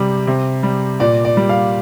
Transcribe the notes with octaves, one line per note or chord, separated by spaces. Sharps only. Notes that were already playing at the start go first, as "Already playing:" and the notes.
Already playing: C3 G3
C3
G3
A#2 D5
D5
G3
F5